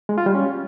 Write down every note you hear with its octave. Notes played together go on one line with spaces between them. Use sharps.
G#3
F4
G3
C#4